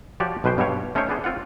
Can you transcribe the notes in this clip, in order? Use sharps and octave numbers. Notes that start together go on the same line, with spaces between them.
F3 F#4 G4 C#5 D5
B1 B2 B4 C5 G5
G2 B2 F#3 G4 C#5 F5
A3 C#4 D#4 C5 C#5 G5
B3 D4 G#4 C5
C4 F4 F5 F#5